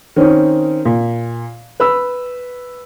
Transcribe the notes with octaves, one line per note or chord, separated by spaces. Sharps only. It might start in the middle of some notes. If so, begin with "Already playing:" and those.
D#3 C4 C#4 D#4
A#2
B4 B5 E6